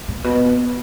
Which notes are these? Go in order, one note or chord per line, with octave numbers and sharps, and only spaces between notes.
A#2
B2